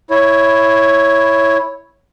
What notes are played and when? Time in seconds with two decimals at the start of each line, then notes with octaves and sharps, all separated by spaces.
0.10 E4 C#5